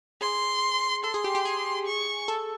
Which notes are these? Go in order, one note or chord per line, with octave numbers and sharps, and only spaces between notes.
G#4 C6
A4 C6
G#4
G4
G4
G#4
C#6
A4